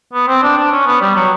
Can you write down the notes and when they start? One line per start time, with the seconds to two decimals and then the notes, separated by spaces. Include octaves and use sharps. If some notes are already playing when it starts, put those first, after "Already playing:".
0.13 B3
0.28 C4
0.43 D4
0.57 D4
0.72 C#4
0.87 B3
1.01 G3
1.16 F#3